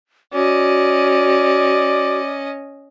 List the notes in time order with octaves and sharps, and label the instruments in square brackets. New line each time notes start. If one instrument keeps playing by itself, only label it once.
[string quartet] C#4 D#5 [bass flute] F#4 [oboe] D5